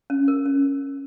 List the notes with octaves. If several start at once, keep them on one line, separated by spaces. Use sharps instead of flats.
C#4
A#4
C#4